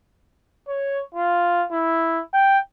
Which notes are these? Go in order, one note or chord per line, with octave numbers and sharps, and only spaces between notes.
C#5
F4
E4
G5